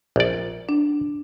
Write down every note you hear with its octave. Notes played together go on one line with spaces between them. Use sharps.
A#1 D5
D4